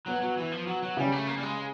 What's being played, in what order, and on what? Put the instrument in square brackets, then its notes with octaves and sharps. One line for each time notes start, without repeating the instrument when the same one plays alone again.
[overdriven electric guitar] F#3 [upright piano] B3
[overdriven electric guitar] F#3
E3
F3
F#3
F#3
[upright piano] C#3 C#4 [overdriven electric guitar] G3
[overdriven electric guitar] A3
A#3
G3
G#3